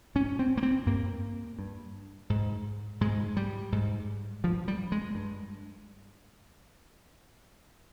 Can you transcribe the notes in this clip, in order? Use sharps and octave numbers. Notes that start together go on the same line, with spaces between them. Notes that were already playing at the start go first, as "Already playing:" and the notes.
G#2 C#4
C4
A#3
C4
G2 A#3
G2
G#2
G#2 G#3
G3
G#2
G2 F3
G3
G#3
G2